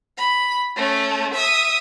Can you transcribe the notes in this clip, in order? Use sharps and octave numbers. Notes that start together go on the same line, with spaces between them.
B5
A3 C#4
E5 D#6